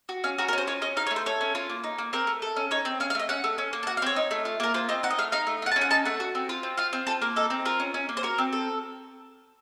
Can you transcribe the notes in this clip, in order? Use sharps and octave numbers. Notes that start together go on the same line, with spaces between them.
F#4
C#4 F5
F#4 A#4
A#4
C#4 C5
F4 C#5
C#4 D#5
D#4 F5
C#5
A3
C5
A4 C#5
C#4
F4
A#3
D#4
A#3
C4 A#4
A3
A4
C#4
D#4 C#5
C4
C#4 F5
F5
A3 D#5
C#4 F#5
A3
C#4
A#3
A5
F#4 F#5
F5
C4 C#5
D#4
A3
F4
A#3 A#4
F4 C5
C4 D#5
D#4 F#5
D#5
A3 F5
D#4 F5
A3
F4 F#5
A5
C#4
F#5
D#4 A5
A3 F#5
F#4
C4
F4
C4
F4 F5
C4
F4 A4
A#3 A#4
D#4 A4
C4
F4 A#4
C#4
C#4
A#3
C5
F#4 A#4
C4
A4